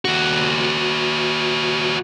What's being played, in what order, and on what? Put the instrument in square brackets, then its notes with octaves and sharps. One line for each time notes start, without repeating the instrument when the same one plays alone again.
[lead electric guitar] D#2 F#4